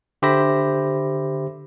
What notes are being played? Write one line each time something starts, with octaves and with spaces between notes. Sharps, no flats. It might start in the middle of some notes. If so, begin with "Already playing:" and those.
D3 G4 C5 E5 B5 A#6